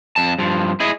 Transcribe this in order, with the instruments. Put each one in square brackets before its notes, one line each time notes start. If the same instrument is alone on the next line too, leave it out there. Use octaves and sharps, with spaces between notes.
[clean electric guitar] F2 A5
G2 F3
E4 G#4 D#5